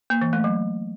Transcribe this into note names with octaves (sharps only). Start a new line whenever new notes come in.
A#3
E3
A3
F#3